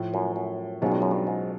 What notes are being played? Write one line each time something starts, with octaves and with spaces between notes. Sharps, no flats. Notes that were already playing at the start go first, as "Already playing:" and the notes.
Already playing: A2 F3 A3
F#2
F#2
B1 G#2 B2 G#3 C#4 F4
G2
F#2
G2
G#2